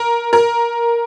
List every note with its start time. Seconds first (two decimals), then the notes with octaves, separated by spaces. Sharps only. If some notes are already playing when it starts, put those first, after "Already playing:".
Already playing: A#4
0.33 A#4